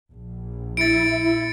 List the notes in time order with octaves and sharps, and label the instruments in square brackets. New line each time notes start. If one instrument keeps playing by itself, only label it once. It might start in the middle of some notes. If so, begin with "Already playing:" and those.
[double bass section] A#1
[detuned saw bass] E4 [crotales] A6 C#7 D7